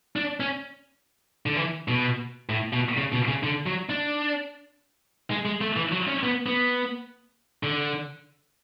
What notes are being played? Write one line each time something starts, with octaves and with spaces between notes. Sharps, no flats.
D4
C#4
D3
E3
B2
A2
B2
C#3
B2
C#3
D3
F#3
D4
G#3
G#3
A3
E3
F#3
C#4
B3
B3
D3